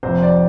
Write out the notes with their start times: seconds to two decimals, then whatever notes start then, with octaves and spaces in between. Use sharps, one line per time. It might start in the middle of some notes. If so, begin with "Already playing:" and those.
0.03 F1 F2 C3 C5
0.22 D5